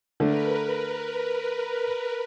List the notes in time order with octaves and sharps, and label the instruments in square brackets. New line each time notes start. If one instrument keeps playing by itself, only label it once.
[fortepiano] D3 A3 [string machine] A#4 B4